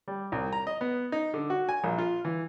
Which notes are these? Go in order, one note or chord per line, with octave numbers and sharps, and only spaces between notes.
G3
C2
A#5
D#5
B3
D#4
D3
F#4
G#5
A#1
F4
E3